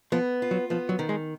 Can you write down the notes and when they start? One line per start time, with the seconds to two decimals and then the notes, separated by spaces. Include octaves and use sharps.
0.12 F3 B3
0.42 F4
0.51 F#3
0.70 F3 B3
0.89 F#3
0.99 D#3
1.09 G#3